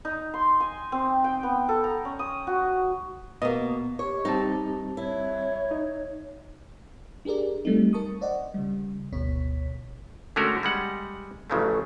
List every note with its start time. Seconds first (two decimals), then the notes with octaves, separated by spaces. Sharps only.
0.05 D#4
0.34 C6
0.60 G#5
0.92 C4
1.24 G5
1.43 B3
1.69 A4
1.84 A#5
2.05 C#4
2.19 D#6
2.47 F#4
3.42 B2 A#3 D#5
3.99 G4 C#5
4.25 G3 C4 D#4 A5
4.97 E4 C#5
5.71 D#4
7.25 D4 G4 G#4 A#4 D5
7.65 G3 A3 C4 D#4
7.93 A#4 A5 C#6 D#6
8.21 C5 D5 D#5 F#5
8.54 C#3 G3
9.13 G1 D2 B2 C#5 B6
10.36 D3 G#3 A3 C#4 F#4 A#4
10.63 G3 G#3 F#5
11.50 A1 C#3 F3 F#3 A3